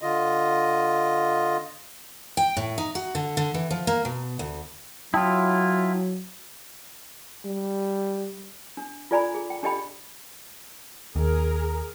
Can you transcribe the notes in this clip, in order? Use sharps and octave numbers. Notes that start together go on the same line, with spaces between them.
D3 F4 D#5
G5
A2
D#4
F#4
D3
D3
E3
F3
A#3
B2
D2
F#3 E4 F4 G5 A5 D#6
G3
D4
F4 A4 D5 G#5 A#5 B5
G#4
G5
D4 G4 A4 D#5 G5 B5
D#2 G#4 A#4